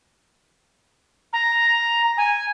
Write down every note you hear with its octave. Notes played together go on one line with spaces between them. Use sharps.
A#5
G#5